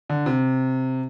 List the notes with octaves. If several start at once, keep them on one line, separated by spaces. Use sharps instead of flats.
D3
C3